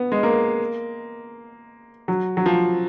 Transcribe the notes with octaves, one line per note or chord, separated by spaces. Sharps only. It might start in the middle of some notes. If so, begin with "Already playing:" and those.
Already playing: B3
G#3
A#3
F#3
F#3
F3